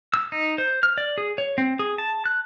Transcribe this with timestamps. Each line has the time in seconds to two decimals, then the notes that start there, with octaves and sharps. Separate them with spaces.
0.14 E6
0.32 D#4
0.58 C5
0.83 F6
0.98 D5
1.18 G#4
1.38 C#5
1.58 C4
1.79 G#4
1.98 A5
2.26 F#6